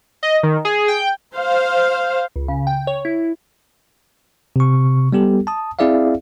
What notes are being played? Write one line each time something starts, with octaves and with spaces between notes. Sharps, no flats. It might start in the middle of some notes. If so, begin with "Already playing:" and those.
D#5
D#3
G#4
G5
C5 F5
C#2
C#3
G5
C#5
E4
C3 C#6
G3 B3 G4 A4
A5 D#6
C4 E4 G#4 D5 E5 F5